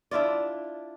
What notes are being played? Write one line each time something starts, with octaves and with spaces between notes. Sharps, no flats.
D4 E4 F4 D5